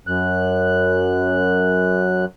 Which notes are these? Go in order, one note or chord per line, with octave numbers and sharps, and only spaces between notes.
F#2 F#6